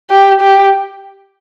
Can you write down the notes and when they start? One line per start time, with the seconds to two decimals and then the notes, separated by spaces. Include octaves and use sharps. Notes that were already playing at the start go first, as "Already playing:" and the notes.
0.10 G4
0.41 G4